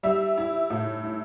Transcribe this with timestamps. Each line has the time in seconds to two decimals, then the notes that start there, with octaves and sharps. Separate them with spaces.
0.03 G3 E5
0.38 E4
0.70 A2
1.04 E4